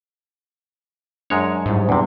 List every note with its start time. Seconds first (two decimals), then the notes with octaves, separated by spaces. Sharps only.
1.30 F#2 G#3 D4 C#5
1.66 G#2 F#3 G3 E4
1.89 E2 C3 B3 D4 E4